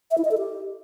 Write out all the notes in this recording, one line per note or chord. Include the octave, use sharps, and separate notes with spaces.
E5
E4
D#5
A4
G4